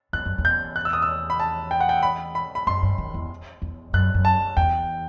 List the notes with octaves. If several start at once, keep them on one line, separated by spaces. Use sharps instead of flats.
E2 F#6
F#2
E2
G6
F#6
E6
D#6
E6
B5
A5
G5
F#5
G5
B5
B5
B5
F#2 C6
G2
D#3
E2
E2
F#2 F#6
F#2
A5
E2 G5